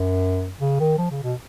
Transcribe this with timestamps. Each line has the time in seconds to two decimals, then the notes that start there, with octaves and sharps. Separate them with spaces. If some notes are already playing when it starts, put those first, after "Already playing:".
Already playing: F#2
0.61 C#3
0.80 D#3
0.98 F3
1.11 C#3
1.23 B2